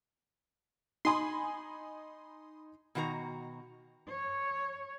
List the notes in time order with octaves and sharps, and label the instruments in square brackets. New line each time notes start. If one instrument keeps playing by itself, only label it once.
[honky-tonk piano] D#4 G#5 B5 [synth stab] C6 D#6
[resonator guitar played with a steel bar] B2 D#3 F#4 C5 A#5
[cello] C#5